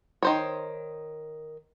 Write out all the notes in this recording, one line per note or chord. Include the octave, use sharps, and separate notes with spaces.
D#3 C5 C#5